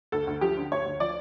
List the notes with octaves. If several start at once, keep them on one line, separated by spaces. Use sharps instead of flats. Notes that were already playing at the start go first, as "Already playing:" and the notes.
D2 A4
D2
F3 G4
D3
D2 C#5
D2
F3 D5